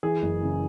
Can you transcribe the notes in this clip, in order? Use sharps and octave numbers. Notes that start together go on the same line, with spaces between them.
E3 G#4
F#1
C#3